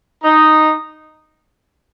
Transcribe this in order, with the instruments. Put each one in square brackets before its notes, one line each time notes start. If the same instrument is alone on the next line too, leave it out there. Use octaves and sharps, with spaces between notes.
[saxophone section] D#4